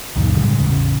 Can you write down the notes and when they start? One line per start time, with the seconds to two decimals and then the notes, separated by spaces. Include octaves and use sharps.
0.16 C#2 F#2 A#2 D#3
0.36 A2 C#3 G3 G#3
0.59 A1 E2 C#3